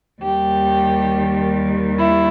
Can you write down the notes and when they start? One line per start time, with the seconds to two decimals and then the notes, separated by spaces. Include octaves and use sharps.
0.23 D#2 D#3 G3 G4
1.99 E4